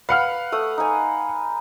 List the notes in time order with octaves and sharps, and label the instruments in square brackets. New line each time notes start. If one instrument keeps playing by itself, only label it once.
[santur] B4 [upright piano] F5 F#5 F6
[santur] A3 D#6
D#4 G#5